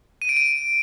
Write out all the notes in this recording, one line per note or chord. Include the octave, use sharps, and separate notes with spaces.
D#7
D7
D#7